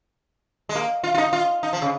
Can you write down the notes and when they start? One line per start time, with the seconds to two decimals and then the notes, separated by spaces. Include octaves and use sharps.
0.69 G#3
0.75 A#3
1.04 F4
1.14 F4
1.18 D#4
1.33 F4
1.63 D#4
1.73 F3
1.82 C#3